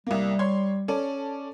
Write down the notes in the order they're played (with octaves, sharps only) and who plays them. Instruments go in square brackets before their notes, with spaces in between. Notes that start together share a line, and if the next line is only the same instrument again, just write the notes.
[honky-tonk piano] C2 A#3 [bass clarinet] G3
[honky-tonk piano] C#5 C6 G#6
C#4 A4 D5